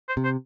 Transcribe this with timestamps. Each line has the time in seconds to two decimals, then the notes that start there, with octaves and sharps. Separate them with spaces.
0.09 C5
0.17 C3
0.24 C5